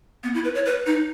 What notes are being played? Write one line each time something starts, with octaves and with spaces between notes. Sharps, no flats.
B3
E4
B4
C#5
B4
D#4